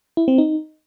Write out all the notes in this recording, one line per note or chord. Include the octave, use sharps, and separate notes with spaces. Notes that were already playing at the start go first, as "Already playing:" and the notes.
E4
C4
D#4